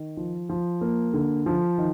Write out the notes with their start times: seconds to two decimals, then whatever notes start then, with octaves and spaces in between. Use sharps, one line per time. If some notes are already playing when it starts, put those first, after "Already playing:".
Already playing: D#3
0.17 F3
0.49 F3
0.81 A#3
1.14 D3
1.46 F3
1.78 D#3